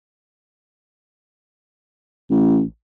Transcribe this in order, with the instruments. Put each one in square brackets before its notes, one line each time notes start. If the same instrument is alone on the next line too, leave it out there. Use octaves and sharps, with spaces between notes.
[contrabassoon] A1